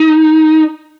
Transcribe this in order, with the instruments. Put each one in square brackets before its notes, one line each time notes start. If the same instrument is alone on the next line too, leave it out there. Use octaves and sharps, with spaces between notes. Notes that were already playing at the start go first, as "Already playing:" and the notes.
Already playing: [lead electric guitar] D#4